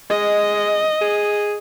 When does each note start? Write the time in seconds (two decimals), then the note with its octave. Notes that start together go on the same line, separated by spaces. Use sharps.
0.10 G#3 D#5
1.01 G#4